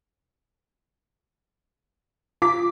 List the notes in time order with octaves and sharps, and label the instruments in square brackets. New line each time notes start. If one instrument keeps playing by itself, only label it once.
[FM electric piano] F4 [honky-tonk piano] D6 B6